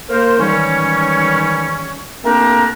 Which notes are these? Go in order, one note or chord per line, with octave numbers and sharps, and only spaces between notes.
A#3 A#4 C5
G#2 D#3 E3 G3 C#4
A3 A#3 C4 D4 G4 A#4